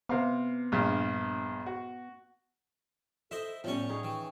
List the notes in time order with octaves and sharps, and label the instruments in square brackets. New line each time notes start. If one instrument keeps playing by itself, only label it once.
[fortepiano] C3 F5 [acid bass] B3
[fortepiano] A#1 G2 F6
F#4
[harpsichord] E4 C5 D#5 [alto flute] A4 [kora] E5
[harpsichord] A2 G3 C#5 [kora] F3 C#4 [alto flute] B3
[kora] D#4 G#4 [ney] C#6
[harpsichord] E3 [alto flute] G5